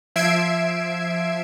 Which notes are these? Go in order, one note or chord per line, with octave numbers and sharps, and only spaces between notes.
F3 E5 G#6 C7 D7 E7